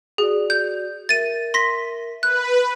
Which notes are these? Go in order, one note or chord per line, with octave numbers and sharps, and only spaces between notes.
F#4 G#4 D5
G6
A#4 E5 A6 D#7
C6 A#6 B6
B4 F#6